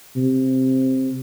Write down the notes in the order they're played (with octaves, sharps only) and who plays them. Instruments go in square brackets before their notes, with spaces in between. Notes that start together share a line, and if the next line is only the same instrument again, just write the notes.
[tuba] C3